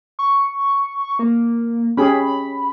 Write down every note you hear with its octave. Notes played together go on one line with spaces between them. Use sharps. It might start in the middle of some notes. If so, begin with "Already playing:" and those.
C#6
A#3
C#4 G4 G#4 B5